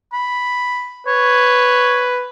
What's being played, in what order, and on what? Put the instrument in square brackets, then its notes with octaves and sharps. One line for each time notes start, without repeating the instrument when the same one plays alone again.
[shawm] B5
[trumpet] B4 [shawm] C#5